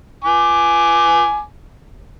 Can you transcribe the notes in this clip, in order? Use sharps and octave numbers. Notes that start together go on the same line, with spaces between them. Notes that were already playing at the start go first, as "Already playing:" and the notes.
G#5 D6